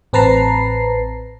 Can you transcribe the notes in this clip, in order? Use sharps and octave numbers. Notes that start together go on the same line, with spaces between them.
A1 C4 B4 A5 A#5 C7